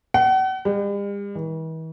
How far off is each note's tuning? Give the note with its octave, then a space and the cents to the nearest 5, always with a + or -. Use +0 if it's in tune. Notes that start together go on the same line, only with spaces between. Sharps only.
F#5 +40
G3 +45
E3 -45